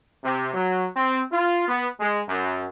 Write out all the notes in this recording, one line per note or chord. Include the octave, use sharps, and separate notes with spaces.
C3
F#3
C4
F4
B3
G#3
F#2